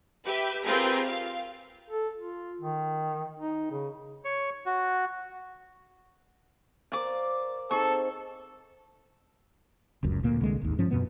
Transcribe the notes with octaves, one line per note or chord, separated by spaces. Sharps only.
G4 B4 E5
C4 F4 G4 G#4 A#4 B4
F5
A4
F4
D#3
D#4
C#3
C#5
F#4
A#4 C5 D5 F5 D6
C4 D#4 G#4 A4 C#6
F1 C#2 F#2
D2 A#2 A#3
C2 D3 G#3
G#1 D#2
G2 F3 C#4
F#2 B2 B3